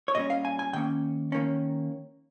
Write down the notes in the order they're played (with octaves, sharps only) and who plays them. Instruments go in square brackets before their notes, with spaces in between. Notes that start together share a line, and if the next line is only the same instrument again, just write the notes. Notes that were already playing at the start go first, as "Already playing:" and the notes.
[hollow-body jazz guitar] C#5
A#2 G3 C#4 D#5
F5
G#5
G#5
D#3 A#3 C#4 G5
D#3 A#3 C#4